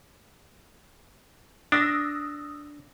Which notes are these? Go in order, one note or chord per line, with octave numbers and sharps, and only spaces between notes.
D4 D#6 E6 A#6